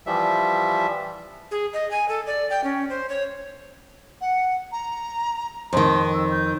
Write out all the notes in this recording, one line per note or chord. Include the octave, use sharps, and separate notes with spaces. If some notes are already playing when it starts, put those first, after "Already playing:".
E3 F3 G3 E5
G#4
D#5
G#5
A4
D5
G5
C#4
C5
C#5
F#5
A#5
F2 D#3 C6
E6
G6